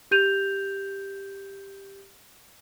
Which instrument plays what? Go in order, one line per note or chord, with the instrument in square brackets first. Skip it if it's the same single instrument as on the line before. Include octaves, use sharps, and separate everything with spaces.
[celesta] G4 G6 D#7 F7